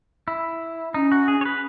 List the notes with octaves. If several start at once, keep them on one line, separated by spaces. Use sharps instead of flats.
E4
C#4 D#4
F#4
G#4
C#5
B4